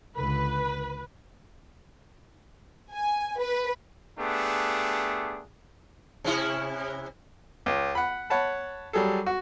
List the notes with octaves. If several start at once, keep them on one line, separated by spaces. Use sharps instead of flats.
C#2 D3 B4
G#5
B4
A3 B3 D4 G4 G#4
C3 C#4 E4
C#2
F#5 B5
C#5 F#5 A5 B5
F#3 G3 G#4 A4
F#4